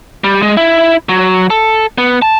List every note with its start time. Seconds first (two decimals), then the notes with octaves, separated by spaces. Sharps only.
0.24 G3
0.42 G#3
0.57 E4
1.09 F#3
1.50 A4
1.98 B3
2.22 A5